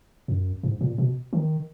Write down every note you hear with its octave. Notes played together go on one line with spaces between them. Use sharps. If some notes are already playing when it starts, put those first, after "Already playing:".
F#2
G#2
A#2
B2
D#3